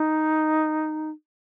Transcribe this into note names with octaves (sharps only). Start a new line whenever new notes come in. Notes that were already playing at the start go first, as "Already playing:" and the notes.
Already playing: D#4